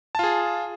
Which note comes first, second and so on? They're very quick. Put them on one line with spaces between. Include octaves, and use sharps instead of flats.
A5 F4 G#4